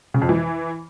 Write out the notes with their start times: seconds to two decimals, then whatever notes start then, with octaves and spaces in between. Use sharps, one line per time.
0.14 C#3
0.22 F2
0.29 E3